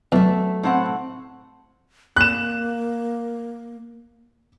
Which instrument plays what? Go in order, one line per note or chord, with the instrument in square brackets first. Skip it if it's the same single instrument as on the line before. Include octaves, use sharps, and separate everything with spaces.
[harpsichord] E2 [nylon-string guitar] F#3 E5 [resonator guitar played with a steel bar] A3
[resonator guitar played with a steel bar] A2 C4 F#5
[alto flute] A#3 [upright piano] F#6 E7